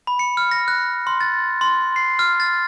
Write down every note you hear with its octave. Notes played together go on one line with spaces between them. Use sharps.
B5
C#7
F6
A#6
F#6
C6
A6
C6
C7
F6
A6